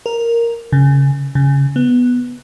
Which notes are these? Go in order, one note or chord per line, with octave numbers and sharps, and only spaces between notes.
A#4
C#3
C#3
B3